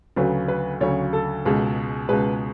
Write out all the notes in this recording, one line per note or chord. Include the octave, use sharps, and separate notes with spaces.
D2 C#3 F#3 B4
B4
D2 C#3 F#3 C#5
A4
C#2 B2 G#3
C#2 B2 G#3 B4